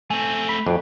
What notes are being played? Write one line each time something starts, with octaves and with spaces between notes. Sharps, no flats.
A3 C4 G#5
B5
F2 D4 F#4 G5